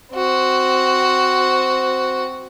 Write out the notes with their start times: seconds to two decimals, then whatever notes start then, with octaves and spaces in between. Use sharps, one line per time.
0.13 C4 F#4